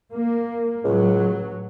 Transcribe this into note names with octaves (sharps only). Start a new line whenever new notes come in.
A#3
C#2 A2 F#3